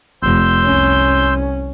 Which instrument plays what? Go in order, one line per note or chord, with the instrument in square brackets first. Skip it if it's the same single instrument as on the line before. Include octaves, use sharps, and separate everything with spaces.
[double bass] F1 [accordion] C6 E6 G6
[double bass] C2 C#4